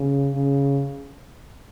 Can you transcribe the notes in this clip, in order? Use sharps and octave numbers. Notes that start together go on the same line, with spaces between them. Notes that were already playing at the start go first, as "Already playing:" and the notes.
Already playing: C#3
C#3